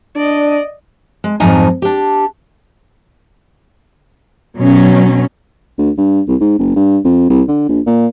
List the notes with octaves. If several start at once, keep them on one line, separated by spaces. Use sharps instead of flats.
D4 D5 D#5
G#3
F2 G#2 F3 F#3 D#4 G#5
D4 G4
B2 F#3 C#4
D2
G2
C2
G#2
F#1
G2
F2
C2
D3
A#1
A#2